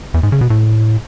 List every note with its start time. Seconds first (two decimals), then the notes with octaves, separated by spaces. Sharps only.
0.14 E2
0.23 G#2
0.32 C#3
0.41 B2
0.50 A2